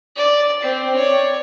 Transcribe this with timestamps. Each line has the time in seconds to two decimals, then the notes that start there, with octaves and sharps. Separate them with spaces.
0.16 D5
0.62 C4
0.96 C#5 D5